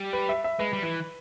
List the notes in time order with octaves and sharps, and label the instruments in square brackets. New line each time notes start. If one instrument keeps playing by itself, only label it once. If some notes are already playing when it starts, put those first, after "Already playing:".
Already playing: [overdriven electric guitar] G3
[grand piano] B4
E5
E5
[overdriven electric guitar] G#3 [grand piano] B4
[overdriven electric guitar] G3
E3